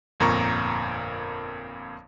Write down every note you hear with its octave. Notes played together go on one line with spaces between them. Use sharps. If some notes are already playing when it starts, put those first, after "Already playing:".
G1 F2 A#2 A#4 A#5 C#6